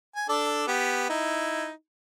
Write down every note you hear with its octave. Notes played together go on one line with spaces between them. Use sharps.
G#5
D4 A4 D5
B3 G4
D#4 E4